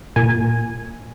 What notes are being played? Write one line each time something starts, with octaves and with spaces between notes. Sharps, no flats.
A#2 A#3 G#5